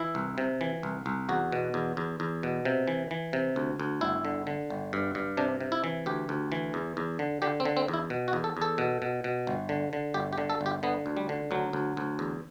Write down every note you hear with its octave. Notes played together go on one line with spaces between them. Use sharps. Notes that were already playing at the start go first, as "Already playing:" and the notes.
Already playing: E3 E4
C2
C3
E3
C2
C2
E2 F#4
B2
E2
E2
E2
B2
C3
E3
E3
C3
D2
D2
G1 E4
D3
D3
G1
G2
G2
C3 D4
C3
E4
E3
D2 G4
D2
E3
E2
E2
D3
D3 G4
C4
D3
C4
E2
E4
B2
F#4
E2
A4
E2 A4
B2
B2
B2
G1
D3
D3
G1 G4
G4
D3
A4
G1
G4
D3 B3
D2
G3
D3
D2 F#3
D2
D2
E2